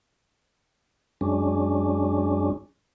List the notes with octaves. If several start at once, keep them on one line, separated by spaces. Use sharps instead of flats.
F#2 G#3 C#4 D4